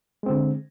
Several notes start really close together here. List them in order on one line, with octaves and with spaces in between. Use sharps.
G#3 C4 D3